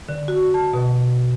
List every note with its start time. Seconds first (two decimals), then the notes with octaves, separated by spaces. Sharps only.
0.09 D3
0.28 F#4
0.54 A5
0.73 B2